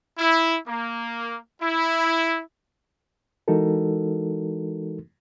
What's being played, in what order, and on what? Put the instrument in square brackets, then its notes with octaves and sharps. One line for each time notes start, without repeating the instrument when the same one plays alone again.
[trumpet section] E4
A#3
E4
[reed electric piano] E3 G#3 D#4 F#4 A4 A#4